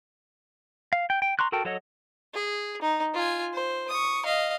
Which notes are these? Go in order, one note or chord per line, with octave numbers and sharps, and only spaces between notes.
F5
G5
G5
A#5 C6 C#6 F#6
F#4 A4 A#4 G5 A5
F#3 A4 C#5 D#5 F#5
G#4
D#4
F4 G#5
C5
C#6 D#6
D#5 F5